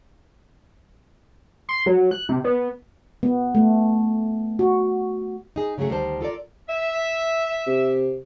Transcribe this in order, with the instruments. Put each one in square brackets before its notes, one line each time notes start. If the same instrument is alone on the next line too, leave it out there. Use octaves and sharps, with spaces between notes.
[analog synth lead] C6
F#3
F#6
C3
B3
[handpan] B3
A3
F#4
[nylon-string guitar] D#4 G#4
C#3 F#3 G#3 A3 G#4
D2 D#3 G3 C5 A5
F4 A4 A#4 D5
[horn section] E5
[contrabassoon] C3